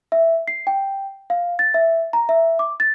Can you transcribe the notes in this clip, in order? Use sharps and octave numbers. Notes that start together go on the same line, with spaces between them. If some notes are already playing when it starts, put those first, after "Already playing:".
E5
C7
G5
F5
A6
E5
A#5
E5
D6
A6